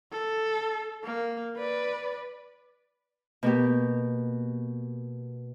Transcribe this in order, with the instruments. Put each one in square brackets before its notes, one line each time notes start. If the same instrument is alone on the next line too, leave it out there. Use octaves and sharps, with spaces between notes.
[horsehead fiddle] A4
A#3
B4 D5
[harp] B2 A#3 G4